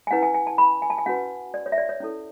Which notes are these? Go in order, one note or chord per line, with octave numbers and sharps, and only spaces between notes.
G#5
C#4 E4 B4 F#5
G#5
G#5
A5
B5
G#5
A5
G#5
C#4 F#4 B4 F#5
D5
C#5
E5
D5
C#5
C#4 E4 A4